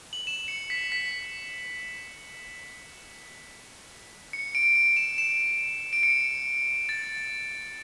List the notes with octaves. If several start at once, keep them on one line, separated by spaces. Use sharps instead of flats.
F#7
E7
C#7
B6
B6
C#7
D7
D7
E7
E7
D7
C#7
A6